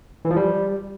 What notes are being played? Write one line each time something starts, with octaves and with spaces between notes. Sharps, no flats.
E3
F3
G3